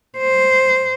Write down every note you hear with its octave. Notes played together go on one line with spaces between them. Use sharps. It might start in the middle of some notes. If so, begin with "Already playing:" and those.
C5